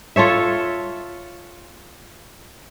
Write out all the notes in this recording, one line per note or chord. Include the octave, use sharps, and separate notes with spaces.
F4 A4 C#5 E5